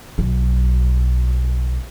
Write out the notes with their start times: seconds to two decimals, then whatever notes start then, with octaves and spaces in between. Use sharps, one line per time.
0.18 B1 F#3